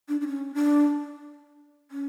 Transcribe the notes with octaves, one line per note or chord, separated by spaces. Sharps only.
D4
D4
C#4
D4
C#4